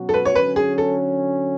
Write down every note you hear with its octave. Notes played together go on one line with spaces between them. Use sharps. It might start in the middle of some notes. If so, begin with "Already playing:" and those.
Already playing: B2 F#3 C#4 F#4
A4
B4
C#5
D3 F#3 C#4 B4
G#4
A4